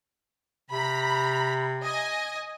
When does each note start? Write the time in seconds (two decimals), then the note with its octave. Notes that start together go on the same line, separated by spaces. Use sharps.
0.70 C3 A#5 B5
1.83 D#5 G#5